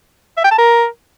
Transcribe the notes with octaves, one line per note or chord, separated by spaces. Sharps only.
E5
G5
A5
A#4